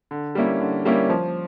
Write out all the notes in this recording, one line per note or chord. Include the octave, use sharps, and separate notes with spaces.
D3
G3 A#3 C#4 E4
D3
G3 A#3 C#4 E4
F3